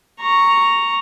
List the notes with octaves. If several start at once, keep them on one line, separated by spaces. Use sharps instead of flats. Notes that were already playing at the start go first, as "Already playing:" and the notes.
A#5 C#6